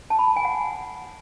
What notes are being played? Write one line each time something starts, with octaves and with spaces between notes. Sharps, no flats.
A5
B5
A5
G#5
F#5